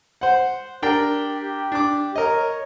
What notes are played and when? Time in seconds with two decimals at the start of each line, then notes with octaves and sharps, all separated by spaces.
0.21 C5 F#5
0.82 D4 G4 A#4 G5
1.72 D4 D6
2.16 A#4 C#5 D#5